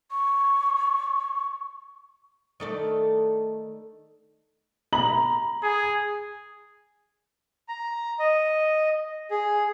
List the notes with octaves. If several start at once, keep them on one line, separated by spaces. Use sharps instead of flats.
C#6
D#3 A3 D5
A#5 B5 F#7
G#4
A#5
D#5
G#4